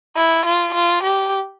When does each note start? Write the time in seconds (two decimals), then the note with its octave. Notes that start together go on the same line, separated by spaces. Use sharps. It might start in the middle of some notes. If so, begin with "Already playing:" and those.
0.17 E4
0.46 F4
0.75 F4
1.03 G4